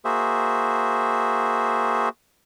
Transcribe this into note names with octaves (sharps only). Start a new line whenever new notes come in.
A#3 F#4 G#4 C5 E5